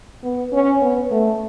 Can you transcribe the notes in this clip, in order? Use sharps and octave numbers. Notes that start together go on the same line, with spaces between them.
B3
C#4
B3
A3